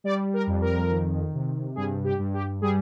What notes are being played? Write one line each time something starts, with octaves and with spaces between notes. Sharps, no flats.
G3 D5
A#4
F2
A#4
D#3
C3
G2 G#4
G4
G2
G4
G3 G#4